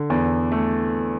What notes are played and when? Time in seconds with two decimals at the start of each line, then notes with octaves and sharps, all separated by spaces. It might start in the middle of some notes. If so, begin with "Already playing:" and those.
Already playing: D3
0.10 E2
0.52 A3